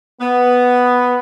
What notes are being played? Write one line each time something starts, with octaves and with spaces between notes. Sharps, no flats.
B3